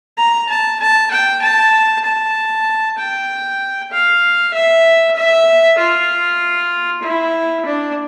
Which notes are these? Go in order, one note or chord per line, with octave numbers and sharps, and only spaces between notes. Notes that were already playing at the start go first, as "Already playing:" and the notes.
A#5
A5
A5
G5
A5
A5
G5
F5
E5
E5
F4
E4
D4